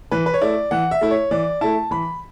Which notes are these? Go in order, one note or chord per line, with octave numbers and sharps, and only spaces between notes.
E3 B4
B4
C#5
A3 E4 D5
E3 F#5
E5
A3 E4
C#5
E3 D5
A3 E4 A5
E3 B5